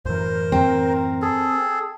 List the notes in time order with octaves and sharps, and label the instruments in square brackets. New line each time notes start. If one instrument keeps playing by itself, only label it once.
[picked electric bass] F#2 A2 E3 [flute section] A#4 [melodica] C5
[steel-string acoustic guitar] C4
[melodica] G#4 A4